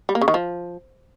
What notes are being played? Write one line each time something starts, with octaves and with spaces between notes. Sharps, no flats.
G3
A#3
C#3
D#3
F3